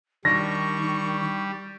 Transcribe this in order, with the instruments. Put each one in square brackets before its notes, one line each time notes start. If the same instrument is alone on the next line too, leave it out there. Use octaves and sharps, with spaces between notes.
[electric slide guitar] D#3 D4 [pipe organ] G3 [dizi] C#6 [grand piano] A#6